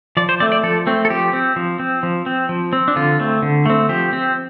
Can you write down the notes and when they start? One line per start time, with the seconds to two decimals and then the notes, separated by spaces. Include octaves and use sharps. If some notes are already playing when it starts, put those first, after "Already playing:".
0.17 F3 D5
0.29 C5
0.40 A3 C4 D5
0.52 D5
0.63 F3 A4
0.87 A3 C4
1.05 A4
1.10 F3 G4
1.33 C4
1.56 F3
1.79 C4
2.03 F3
2.26 C4
2.49 F3
2.73 C4
2.88 D4
2.96 D3 F4
3.20 A3 C4
3.42 D3
3.66 A3 C4
3.89 F3 G4
4.13 C4